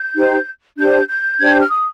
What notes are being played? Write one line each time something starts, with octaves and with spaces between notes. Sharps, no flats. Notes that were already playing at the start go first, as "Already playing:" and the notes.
Already playing: G6
D#4 G4 C5
D4 G4 C5 G6
G6
D4 G4 C5 G#6
G6
F6
D#6